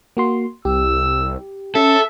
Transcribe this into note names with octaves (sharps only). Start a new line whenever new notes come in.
A#3 F#4 C6
C2 G4 E6
C#4 A4 E5